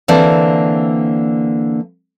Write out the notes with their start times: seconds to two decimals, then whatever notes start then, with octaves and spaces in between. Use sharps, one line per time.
0.08 D3 E3 A#3 C4 D5 A5